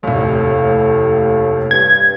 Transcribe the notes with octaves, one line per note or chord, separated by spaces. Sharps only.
F1 D#2 A2
G2 G#6